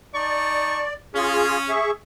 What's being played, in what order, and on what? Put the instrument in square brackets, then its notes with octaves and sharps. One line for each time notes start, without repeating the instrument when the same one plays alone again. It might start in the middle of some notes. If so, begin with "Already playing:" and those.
[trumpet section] D#4 A5 C#6 [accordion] D5
[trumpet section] C#4 [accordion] F4 G#4
[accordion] G#4 E5 C#6